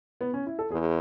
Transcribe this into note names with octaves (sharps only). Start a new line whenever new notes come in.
B3
C#4
E4
A4
E2 G#4